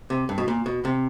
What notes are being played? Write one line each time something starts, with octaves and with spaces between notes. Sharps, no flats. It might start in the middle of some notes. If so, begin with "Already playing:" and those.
C3
G2
B2
A#2
B2
C3